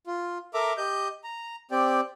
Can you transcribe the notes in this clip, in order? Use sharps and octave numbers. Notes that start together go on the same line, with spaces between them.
F4
A4 A#4 E5 A#5 D6
G4 D#5 G6
A#5
C4 G4 D5 G5